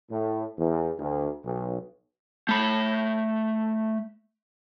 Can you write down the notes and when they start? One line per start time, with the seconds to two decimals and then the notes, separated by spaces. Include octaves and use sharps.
0.11 A2
0.58 E2
0.98 D2
1.43 B1
2.49 A3 B5